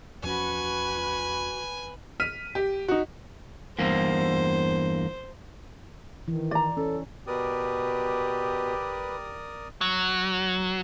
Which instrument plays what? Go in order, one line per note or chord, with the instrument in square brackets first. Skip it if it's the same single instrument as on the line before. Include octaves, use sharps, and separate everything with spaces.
[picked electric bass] E2 F3 C#4 [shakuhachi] F#4 [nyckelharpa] B4 B5 [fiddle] G#5
[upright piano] F6 B6 D#7
G4
D#4 F#4
[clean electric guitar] E2 G2 A#3 [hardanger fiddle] C5
[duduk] D#3 [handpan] E3
[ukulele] D5 A#5
[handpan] C#4 [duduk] A4
[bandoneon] B2 [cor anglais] G4 [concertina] A#4 D5 D#6 [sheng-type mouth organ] B4
[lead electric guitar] F#3